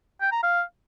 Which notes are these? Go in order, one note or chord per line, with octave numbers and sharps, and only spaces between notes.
G5
A#5
F5